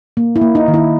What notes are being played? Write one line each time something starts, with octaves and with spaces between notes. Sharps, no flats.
A#3
E4
A#3
D#4
D#3
E4